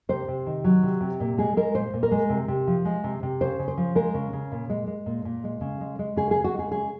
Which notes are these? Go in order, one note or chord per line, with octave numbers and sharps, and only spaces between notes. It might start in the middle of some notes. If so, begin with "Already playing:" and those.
C3 C5
C3
D#3
F#3
C3
C3
A#2
G#3 G#4
G#3 A#4
A#2 C5
A#2
A#4
G#3
C3
C3
F3
G#3
C3
C3
C#3 C5
C#3
C5
F3
G#3 A#4
C#3
C#3
A#2
G#3
G#3
A#2
A#2
G#3
C#3
G#3
G#3
C#3 G#4
C#3 G#4
F#4
G#3
G#4
C#3 G#4